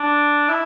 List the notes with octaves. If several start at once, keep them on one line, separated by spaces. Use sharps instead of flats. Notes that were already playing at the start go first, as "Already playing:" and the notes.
Already playing: D4
E4